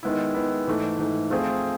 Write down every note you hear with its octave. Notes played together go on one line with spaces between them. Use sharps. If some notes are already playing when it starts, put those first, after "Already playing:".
D#3 G#3 B3 E4
D#3 G#3 B3 E4
G#2 E3 A3
G#2 E3 A3
F3 A3 C4 F4 G#4